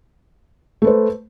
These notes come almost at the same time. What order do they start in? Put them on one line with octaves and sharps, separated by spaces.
A3 B4 C5